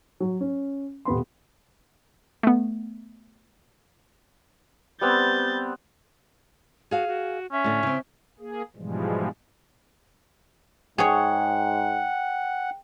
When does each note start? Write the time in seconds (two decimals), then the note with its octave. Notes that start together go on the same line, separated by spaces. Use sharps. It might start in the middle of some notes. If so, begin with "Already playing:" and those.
0.20 F#3
0.41 C#4
1.05 D#1 B2 B3 B5 C6
2.43 A3 B3
5.01 G3 B3 C4 G6 A6
6.91 F#4 G#4 F5
7.08 F#4
7.52 C#4 E5
7.64 A2 D3
7.83 C#3 C4
8.39 A#3 G#4
8.76 G#2 B2 E3 F3 G3 G#3
10.98 G#2 G#4 C#5 F#5 G5